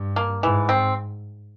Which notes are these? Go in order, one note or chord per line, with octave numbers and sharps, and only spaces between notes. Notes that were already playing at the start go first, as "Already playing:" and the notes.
Already playing: G2
A#3
G#2 E3
C4